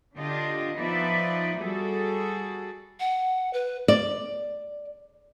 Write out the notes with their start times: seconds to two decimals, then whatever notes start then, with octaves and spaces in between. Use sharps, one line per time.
0.16 D3 D4 F4 G4 D#5
0.76 F3 B3 D#4 B4 D5 E5
1.59 G3 F#4 G#4 A4
3.00 F#5
3.53 B4
3.88 D5